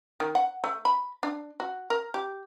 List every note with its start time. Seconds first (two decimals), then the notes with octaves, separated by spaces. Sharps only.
0.20 D#3
0.35 F#5
0.64 A3
0.85 B5
1.23 D4
1.60 F#4
1.90 A#4
2.14 G4